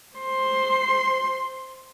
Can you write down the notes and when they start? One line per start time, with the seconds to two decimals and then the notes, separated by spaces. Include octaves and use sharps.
0.16 C5 C6